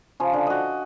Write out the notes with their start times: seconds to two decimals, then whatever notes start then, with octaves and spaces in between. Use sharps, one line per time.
0.20 C#3 F3
0.33 D3
0.47 F#4 D#5